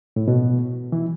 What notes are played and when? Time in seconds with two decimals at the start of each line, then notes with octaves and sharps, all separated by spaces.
0.16 A2
0.28 B2
0.92 E3